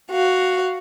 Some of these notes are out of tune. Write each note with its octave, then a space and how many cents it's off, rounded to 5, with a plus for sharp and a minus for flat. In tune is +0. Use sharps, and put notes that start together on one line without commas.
F#4 +0 F5 +0